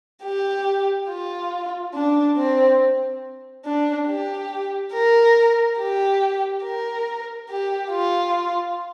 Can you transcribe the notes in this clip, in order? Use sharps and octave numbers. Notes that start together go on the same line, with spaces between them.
G4
F4
D4
C4
D4
G4
A#4
G4
A#4
G4
F4